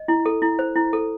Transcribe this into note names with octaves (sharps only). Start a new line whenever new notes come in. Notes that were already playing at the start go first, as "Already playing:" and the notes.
Already playing: D#5
E4
A4
E4
C5
E4
A4